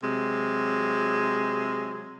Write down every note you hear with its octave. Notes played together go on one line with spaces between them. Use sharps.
C3 F#3 G#3